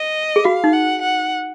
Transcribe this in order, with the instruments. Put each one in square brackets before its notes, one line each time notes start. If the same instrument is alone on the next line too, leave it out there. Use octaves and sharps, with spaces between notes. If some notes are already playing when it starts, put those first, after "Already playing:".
Already playing: [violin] D#5
[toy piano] G#4
[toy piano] F#4 [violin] F5
[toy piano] D#4
[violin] F#5
F#5